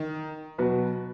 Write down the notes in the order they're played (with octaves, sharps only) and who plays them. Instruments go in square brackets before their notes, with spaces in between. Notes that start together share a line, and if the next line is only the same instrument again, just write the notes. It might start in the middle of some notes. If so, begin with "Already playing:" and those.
Already playing: [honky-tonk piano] D#3
[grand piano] B2 F#3 B3 F#4 B4